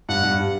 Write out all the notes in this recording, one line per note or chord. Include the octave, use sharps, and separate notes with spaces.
G2 F#5
G2
G3